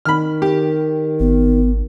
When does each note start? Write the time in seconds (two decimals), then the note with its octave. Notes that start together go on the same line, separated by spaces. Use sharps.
0.05 D#3 B5 F6
0.42 G4
1.20 G#1 B3